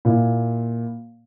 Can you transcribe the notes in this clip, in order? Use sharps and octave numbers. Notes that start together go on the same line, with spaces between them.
A#2 E4